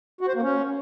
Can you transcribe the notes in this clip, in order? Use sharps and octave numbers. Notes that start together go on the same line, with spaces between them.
F#4
C5
A#3
C#4